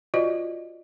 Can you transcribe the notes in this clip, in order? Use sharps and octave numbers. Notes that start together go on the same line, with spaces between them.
F4 F#4 C5 D5 D#5